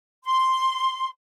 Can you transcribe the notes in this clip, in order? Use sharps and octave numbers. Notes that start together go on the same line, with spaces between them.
C6